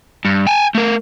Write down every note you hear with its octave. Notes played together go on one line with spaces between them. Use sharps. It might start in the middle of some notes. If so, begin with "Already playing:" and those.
G2
G5 G#5
A3 A#4